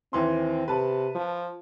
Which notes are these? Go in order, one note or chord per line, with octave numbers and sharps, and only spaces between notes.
D#2 E3 C4 C6
C3 B4 A5
F3